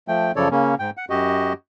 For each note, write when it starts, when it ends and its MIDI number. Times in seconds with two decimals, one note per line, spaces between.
0.08 0.32 53
0.08 0.32 57
0.08 0.32 79
0.36 0.48 42
0.36 0.48 49
0.36 0.48 53
0.36 0.48 69
0.36 0.48 73
0.36 0.48 74
0.51 0.75 49
0.51 0.75 58
0.51 0.75 61
0.79 0.90 44
0.79 0.90 79
0.97 1.05 78
1.10 1.53 42
1.10 1.53 66
1.10 1.53 67
1.10 1.53 75